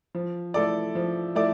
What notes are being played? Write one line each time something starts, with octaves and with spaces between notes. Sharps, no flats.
F3
A3 E4 A4 D5
F3
A3 E4 A4 D5